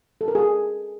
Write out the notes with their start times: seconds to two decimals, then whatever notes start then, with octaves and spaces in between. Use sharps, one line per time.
0.21 A4
0.28 A#4
0.35 G#4